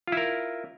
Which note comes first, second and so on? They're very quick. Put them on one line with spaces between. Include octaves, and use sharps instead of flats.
F4 E4 A#4